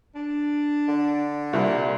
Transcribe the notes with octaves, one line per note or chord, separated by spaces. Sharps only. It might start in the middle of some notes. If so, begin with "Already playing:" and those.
D4
D3
C2 A#2